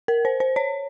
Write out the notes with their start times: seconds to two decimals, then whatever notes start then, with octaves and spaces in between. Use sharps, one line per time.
0.08 A#4
0.25 C5
0.40 C5
0.56 C#5